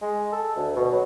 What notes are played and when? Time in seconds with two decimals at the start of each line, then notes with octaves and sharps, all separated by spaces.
0.02 G#3
0.32 A4
0.56 D2
0.76 B2
0.92 F#3